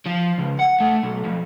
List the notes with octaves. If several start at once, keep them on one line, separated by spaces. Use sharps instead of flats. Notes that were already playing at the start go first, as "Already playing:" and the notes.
F3
C#2
F#5
A3
B1
F2